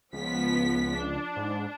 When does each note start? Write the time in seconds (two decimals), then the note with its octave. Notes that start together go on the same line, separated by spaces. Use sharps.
0.13 C#2 F3 B3 B6
0.96 D4
1.36 G#2